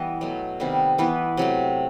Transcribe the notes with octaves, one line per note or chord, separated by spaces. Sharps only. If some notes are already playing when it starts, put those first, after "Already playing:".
Already playing: E3 G3 B3 D#5
B2 F#3 A3
C3 D#3 G3 B3
E3 B3 B4
C3 F#3 A3